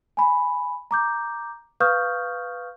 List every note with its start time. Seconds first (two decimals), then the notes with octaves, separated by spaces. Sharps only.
0.17 G#5 B5
0.91 A#5 D6 G6
1.80 B4 F5 C#6 D#6 F6 G6